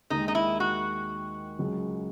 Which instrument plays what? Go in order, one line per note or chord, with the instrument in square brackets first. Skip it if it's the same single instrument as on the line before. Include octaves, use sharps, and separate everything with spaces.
[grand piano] D#2 D#3 G#3 [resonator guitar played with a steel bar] D#4
[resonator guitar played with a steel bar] D#4
E4
F#4
[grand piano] C#2 C#3 F#3